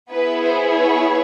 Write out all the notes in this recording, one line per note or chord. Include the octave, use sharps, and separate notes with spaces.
B3 E4 G#4 B4
C5
C#5